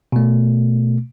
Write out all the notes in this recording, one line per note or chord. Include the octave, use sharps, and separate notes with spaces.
B2 A3